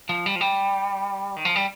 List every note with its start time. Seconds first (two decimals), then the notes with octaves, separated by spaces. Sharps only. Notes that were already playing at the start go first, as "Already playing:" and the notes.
0.09 F3
0.26 G3
0.36 F3
0.41 G3
1.36 D#3
1.45 F3
1.56 G3